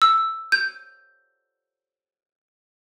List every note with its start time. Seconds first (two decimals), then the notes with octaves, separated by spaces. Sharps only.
0.02 E6
0.52 G6